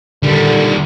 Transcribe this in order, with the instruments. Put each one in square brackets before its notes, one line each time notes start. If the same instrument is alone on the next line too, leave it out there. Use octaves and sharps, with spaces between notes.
[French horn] D3 [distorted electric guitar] D#3 G3